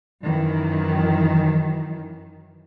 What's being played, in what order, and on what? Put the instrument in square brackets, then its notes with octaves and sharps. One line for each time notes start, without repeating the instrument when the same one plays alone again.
[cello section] F#2 D#3 E3